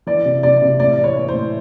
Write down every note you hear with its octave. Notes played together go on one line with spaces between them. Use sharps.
E3 D5
C3
C3 D5
C3
A2 D5
E3
C#5
E3
C5
A2